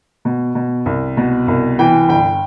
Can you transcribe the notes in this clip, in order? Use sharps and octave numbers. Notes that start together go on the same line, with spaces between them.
B2
B2
C2
B2
C2
E3 G5
G1 G5